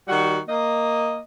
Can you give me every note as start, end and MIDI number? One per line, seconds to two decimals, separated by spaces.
0.08 0.39 51
0.08 0.39 55
0.08 0.39 66
0.49 1.18 58
0.49 1.18 75